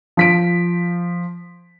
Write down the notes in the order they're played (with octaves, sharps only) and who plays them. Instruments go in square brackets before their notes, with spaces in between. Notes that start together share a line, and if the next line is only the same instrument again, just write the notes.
[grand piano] F3 B6 D7